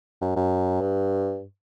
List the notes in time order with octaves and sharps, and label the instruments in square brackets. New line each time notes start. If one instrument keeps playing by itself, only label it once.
[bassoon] F#2
F#2
G2